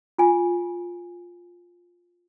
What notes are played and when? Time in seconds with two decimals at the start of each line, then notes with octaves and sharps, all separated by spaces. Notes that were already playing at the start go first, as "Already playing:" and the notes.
0.19 F4 G#5